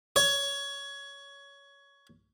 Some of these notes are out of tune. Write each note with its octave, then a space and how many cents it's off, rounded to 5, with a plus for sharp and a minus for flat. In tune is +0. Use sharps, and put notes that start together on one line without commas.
C#5 +15